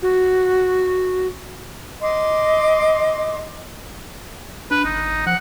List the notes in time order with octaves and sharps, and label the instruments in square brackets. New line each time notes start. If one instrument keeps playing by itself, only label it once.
[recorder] F#4
[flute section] D#5 C6 D6
[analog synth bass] D4 [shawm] B4
[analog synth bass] G1 [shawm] D#4
[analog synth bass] F3 [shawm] F#5